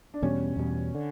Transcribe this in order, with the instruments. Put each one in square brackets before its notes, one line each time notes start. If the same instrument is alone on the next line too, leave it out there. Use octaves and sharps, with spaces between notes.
[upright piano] D4
[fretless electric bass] E2 B2 G3 [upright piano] C#4
[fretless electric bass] E2 B2 G3
D3